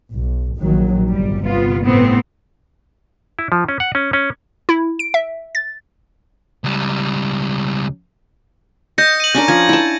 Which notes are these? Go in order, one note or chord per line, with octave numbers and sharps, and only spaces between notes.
B1
A#1 D#3 F#3
G1 C3 G3
B3 F4
A2 B3 C4
E4
F3
C#4
F#5
C#4
C#4
E4
D7
E5
A6
C#2 G3
D#5 G6 A#6 C#7
D#7 F#7
C#4 D4 A#4 G6
F3 G#6
E4 A5